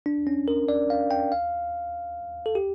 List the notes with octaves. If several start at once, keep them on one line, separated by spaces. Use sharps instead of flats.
D4
C#4
A#4
D5
F5
G5
F5
A4
G4